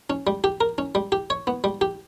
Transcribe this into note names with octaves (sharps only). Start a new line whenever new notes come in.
C#4
G3
G4
A#4
C#4
G3
G4
C#5
B3
G3
G4